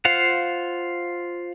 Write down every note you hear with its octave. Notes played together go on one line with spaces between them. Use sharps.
F4 C5 F5 F#5